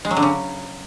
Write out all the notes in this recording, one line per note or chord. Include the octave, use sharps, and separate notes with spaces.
G#3
F#3
D3
C#3